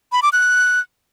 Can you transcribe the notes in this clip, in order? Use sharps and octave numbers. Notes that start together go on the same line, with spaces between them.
B5
D6
F#6